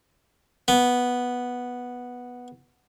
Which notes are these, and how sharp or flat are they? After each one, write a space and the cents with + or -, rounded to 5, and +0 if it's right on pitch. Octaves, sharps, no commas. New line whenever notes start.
B3 -5